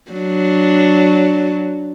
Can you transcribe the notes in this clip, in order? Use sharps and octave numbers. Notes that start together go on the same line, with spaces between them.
F#3 D4